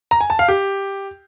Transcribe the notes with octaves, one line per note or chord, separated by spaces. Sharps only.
A#5
G#5
A5
F5
G4